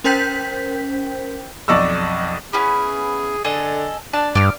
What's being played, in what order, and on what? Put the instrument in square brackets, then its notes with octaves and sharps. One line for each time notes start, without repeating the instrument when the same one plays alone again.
[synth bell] C#4 A#4 C5 G5 G6 B6
[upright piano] B1 F2 D5 D#5 C#6 E6
[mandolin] B3 C#4 E4 [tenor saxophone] G#4
[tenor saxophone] D3 [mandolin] G#4 A4 D#5
[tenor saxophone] D4 [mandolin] A5
[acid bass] G2 [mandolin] D5 F6